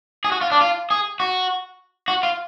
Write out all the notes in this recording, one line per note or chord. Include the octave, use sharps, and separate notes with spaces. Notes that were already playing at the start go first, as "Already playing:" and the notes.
G#4
F#4
F4
D4
F4
G#4
F#4
F#4
F4